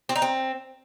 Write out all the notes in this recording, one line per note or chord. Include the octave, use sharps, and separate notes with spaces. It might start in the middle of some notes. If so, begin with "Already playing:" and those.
C4
D#4
C4